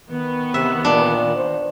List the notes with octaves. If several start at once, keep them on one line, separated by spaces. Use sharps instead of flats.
D#3 B3
C3 E5
A#2 D4
C5